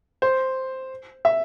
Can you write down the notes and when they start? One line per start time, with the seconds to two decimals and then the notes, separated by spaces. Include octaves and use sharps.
0.22 C5
1.25 E5